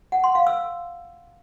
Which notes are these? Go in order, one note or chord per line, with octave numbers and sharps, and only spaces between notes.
F#5
C6
F5
E6